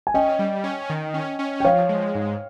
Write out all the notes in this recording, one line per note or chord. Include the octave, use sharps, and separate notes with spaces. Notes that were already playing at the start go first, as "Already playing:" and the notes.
G#5
C#4 D#5 G5
G3
C#4
D#3
C#4
C#4
G5
F3 C#5 F5
G#3
G#2